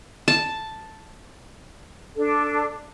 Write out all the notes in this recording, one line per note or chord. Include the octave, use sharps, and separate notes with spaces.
A5
D4 A4